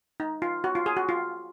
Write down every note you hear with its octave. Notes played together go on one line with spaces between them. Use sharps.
D#4
F4
F#4
F4
G#4
F#4
F4